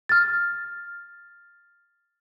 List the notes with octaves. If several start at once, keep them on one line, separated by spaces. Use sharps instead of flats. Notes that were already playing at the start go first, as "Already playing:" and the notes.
F6 A6